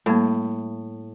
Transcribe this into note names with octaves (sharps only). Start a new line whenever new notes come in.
A2 G3 A#3